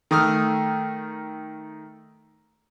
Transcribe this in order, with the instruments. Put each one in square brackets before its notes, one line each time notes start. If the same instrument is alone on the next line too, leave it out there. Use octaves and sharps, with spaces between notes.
[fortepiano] D#3 A3 D#6 F6